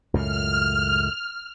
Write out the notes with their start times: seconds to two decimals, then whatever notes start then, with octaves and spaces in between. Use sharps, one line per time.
0.14 C#2 F#2 A2 F6